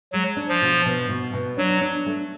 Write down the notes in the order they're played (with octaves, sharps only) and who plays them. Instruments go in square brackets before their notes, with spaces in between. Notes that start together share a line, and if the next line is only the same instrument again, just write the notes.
[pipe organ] F#3 [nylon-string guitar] G#3
[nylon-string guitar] D4
[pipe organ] F3
[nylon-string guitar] B2
B2
B2
B2
[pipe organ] F#3 [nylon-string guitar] D4
[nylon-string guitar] D4
A3